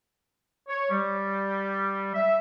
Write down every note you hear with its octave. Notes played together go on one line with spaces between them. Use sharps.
C#5
G3
E5